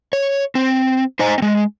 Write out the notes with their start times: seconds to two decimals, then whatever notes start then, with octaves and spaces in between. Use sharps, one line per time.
0.13 C#5
0.55 C4
1.19 D#4 C5 D#5 G#5 A#5
1.38 G#3 C4